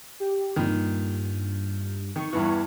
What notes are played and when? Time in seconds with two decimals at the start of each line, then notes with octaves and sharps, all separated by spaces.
0.20 G4
0.56 G2 A#2 D#3
2.16 D#3 C#6
2.33 E2 G2 E3